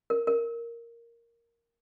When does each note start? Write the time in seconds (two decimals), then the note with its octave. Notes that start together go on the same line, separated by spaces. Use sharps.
0.10 A#4
0.27 A#4